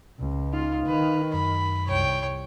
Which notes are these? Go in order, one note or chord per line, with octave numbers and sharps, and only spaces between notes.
C#2
D#4 F4 F5
D#3 B4
F#2 B5
C2 C#5 G5